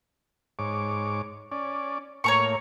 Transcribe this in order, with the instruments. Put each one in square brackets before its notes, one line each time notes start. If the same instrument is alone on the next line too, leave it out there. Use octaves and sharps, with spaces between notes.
[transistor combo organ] G#2 C#5 D6
C#4 D5
[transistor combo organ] A2 A#3 [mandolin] C#5 A#5 C#6